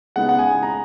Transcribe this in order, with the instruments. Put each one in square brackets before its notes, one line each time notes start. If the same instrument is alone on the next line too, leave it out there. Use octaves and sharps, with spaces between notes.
[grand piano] C#3 G#3 B3 D#4 F#5
F#5
G#5
A#5